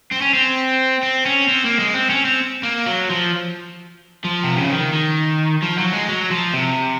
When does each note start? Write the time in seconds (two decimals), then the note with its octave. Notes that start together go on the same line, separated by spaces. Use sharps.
0.11 C4
0.21 C#4
0.33 C4
1.03 C4
1.26 C#4
1.48 C4
1.64 A#3
1.79 G#3
1.94 C4
2.10 C#4
2.25 C4
2.63 A#3
2.86 F#3
3.10 F3
4.24 F3
4.44 C3
4.57 C#3
4.71 D#3
4.93 D#3
5.62 F3
5.78 F#3
5.92 G#3
6.08 F#3
6.31 F3
6.53 C3